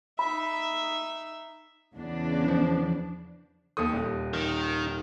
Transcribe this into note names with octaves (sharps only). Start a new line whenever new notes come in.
D#4 E5 B5
E2 C#3 D4
F3
D#2 A4 D#6
D#1
D#3